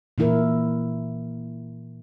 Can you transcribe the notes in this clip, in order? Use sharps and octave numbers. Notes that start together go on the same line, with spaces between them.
A#2 E3 E4 A#4